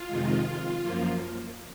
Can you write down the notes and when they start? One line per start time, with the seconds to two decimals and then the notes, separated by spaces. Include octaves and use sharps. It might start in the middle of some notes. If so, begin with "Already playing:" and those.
Already playing: F4
0.08 F2 C3 D#3 G#3
0.82 F#2 F3 A#3